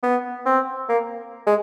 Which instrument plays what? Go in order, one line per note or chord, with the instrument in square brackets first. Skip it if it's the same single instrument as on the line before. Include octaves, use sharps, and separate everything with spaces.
[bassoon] B3
C4
A#3
G#3